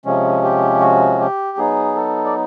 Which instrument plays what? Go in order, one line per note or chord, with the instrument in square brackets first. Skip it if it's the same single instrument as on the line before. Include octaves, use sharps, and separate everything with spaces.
[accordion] C3 F3 G#3 C#4
G4
F#4
G4
F#3 B3 D#4 G#4
A4
D5